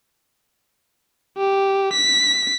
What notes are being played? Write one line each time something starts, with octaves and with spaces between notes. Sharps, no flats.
G4
B6